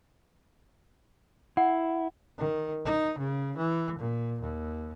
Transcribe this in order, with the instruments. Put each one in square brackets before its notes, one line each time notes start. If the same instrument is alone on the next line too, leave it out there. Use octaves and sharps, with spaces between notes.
[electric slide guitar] E4 [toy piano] F#5
[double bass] D#3
D#4
C#3
E3
A#2
D#2